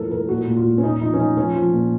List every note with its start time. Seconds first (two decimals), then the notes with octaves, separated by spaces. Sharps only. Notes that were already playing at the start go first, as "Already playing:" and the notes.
Already playing: A2 F3 A4 A#4
0.11 A2 A#4
0.29 A#2 F#4
0.47 A#2
0.56 F4
0.65 A#2
0.78 C#4
0.83 A#2 D#4
1.01 F3 D#4
1.14 C#4
1.19 F3 D#4
1.37 F3 C#4
1.55 F3
1.73 A#2